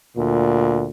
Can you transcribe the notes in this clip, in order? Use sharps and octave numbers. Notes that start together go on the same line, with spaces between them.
D2 A#2